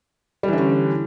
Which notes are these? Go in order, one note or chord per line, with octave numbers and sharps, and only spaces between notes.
D3 E3 G3 C#4